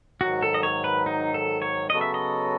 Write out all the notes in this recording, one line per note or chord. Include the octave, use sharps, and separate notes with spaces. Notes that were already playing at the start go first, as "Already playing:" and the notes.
G#2 D#3 F#3 F#4
A4
D#5
C#5
B4
D#4
A4
C#5
C#3 F#3 B3 F#4 A4 D#5
E5
D#5